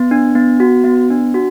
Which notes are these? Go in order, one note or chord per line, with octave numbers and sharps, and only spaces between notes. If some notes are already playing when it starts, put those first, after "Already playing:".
Already playing: B3
D4
B3
F#4
B3
D4
F#4